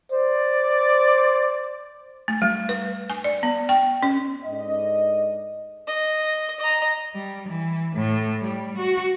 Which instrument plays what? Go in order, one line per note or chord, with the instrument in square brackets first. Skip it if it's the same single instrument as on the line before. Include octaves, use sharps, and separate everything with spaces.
[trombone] C5 [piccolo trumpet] D5
[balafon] A3
G3
B4
G#5
D5
B3
G5
C#4
[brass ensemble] G#2 A3 D4 D#5
[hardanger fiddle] D#5
D#5 A#5
[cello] G3
E3
A2
G3
F#4